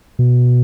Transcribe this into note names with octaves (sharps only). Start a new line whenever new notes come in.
B2